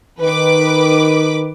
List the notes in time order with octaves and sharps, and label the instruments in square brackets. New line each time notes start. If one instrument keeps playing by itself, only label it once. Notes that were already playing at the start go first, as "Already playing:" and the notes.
[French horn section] D#3 [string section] B4 D6